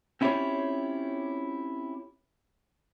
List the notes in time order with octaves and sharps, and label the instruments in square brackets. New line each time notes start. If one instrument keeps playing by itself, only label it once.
[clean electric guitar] C4 C#4 E4 F4 G4 C#5